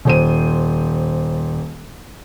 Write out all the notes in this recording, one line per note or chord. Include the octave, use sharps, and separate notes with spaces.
D#1 C5 D#7